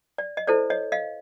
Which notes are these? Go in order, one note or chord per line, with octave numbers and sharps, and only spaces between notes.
D5
D#5
E4 A4 C5 D5
C#5 D#5
D#5 F5